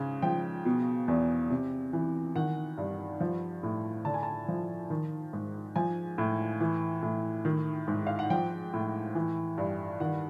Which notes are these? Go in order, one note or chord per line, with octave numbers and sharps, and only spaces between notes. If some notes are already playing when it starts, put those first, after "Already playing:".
Already playing: G#2 C#3
F3 G5
B2
E2
C3
E3
D#3 F#5
G2
F3
A2
D3 A5
G#5
A5
F3
D#3
G#2
F3 G#5
A2
E3
A2
D#3
G#2
F5
F#5
F3 G5
A2
E3
G2
D#3 F#5